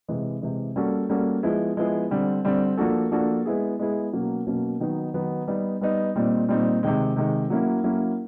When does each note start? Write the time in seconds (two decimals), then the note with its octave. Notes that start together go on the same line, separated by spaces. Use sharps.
0.08 C3 E3 G#3
0.42 C3 E3 G#3
0.76 G3 A#3 C#4 F#4 A4
1.09 G3 A#3 C#4 F#4 A4
1.43 F3 G#3 B3 E4 G#4
1.77 F3 G#3 B3 E4 G#4
2.11 D3 G3 C4
2.45 D3 G3 C4
2.77 F3 A#3 D4 F#4 A4
3.11 F3 A#3 D4 F#4 A4
3.45 G#3 B3 E4 G#4
3.79 G#3 B3 E4 G#4
4.13 B2 F#3 A#3 C#4
4.47 B2 F#3 A#3 C#4
4.80 D#3 F#3 B3 D#4
5.14 D#3 F#3 B3 D#4
5.48 G3 B3 D#4
5.81 G3 B3 D#4
6.15 A#2 G3 C4 D#4
6.48 A#2 G3 C4 D#4
6.83 C3 D#3 G#3
7.16 C3 D#3 G#3
7.50 F#3 A#3 C#4 E4
7.84 F#3 A#3 C#4 E4